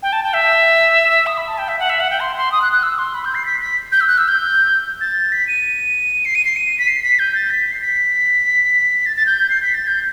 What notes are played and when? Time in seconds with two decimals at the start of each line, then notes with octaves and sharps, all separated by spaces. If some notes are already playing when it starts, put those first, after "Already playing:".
0.03 G5
0.13 A5
0.23 G5
0.34 E5
1.27 D#6
1.37 B5
1.48 A5
1.58 G5
1.68 E5
1.79 F#5
1.90 E5
2.00 F#5
2.10 G5
2.20 C6
2.36 C6
2.52 D#6
2.62 F#6
2.72 F#6
2.83 E6
2.98 C6
3.14 B5
3.25 G6
3.35 C7
3.46 B6
3.61 B6
3.92 G6
4.01 E6
4.07 F#6
4.18 E6
4.28 G6
5.01 A6
5.32 B6
5.48 D#7
6.25 C7
6.35 D#7
6.45 C7
6.56 D#7
6.78 B6
6.88 C7
7.03 B6
7.19 G6
7.35 A6
7.51 B6
7.72 C7
7.82 B6
9.06 A6
9.16 A6
9.26 G6
9.50 C7
9.62 B6
9.74 A6
9.87 G6